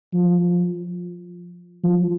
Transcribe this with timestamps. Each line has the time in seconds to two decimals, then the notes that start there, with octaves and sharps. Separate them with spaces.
0.14 F3
1.84 F3